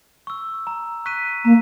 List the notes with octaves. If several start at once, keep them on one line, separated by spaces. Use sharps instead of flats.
C#6 E6
A#5
C#6 F#6 B6 D#7
A#3 A#5